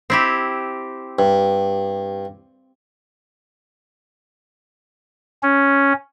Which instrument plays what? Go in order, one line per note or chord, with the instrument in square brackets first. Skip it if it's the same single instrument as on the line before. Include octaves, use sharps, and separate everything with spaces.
[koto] C4 E4 G4
[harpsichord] G2
[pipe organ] C#4